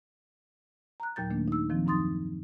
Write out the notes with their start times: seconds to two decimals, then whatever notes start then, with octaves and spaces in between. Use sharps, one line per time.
1.00 A#5 F#6
1.16 D#2 A#2 F#3 G6 A6
1.30 D#3 A3 A#3 D4
1.48 D#4 E6
1.70 D#3 F3 C4
1.86 F#2 F#3 D#4 C6 D#6 A6